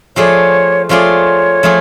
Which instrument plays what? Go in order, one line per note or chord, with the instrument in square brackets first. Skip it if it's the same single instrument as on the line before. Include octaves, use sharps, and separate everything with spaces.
[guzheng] F3 A3 F4 G#4 D5 [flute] C#5
[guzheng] F3 A3 F4 G#4 D5 [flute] C#5
[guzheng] F3 A3 F4 G#4